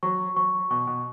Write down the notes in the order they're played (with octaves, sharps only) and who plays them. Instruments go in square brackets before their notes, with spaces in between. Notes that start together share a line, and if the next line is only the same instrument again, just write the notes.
[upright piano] F#3 [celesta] C#6
[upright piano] F#3 [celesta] C#6
[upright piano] B2 [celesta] C#6
[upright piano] B2